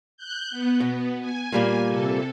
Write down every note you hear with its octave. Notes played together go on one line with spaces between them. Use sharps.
F#6 G6
B3
B2
G#5
A#2 G3 A#3
C3 A4